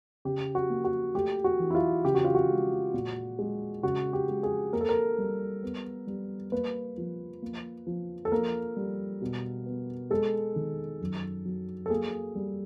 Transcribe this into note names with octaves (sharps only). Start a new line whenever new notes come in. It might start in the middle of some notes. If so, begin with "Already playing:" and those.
C#3 G4
F#4
A#3
F#4
A3 G4
F#4
E3
E4
F4
C#3 G4
F#4
F4
F#4
G#3
A#2
G#3
C#3 F#4
G4
G#3
G#4
A#3 A#4
A4
A#4
G3
B3
G3
A#3 B4
F3
A#3
F3
A4
A#3 A#4
G3
B2
B3
G#3 A4
D#3
F#2
F#3
A4
A#3 G#4
G3